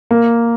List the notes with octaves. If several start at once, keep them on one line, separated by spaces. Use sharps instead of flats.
A#3